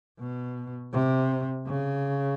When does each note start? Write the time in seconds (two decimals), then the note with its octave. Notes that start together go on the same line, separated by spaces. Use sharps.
0.20 B2
0.93 C3
1.66 C#3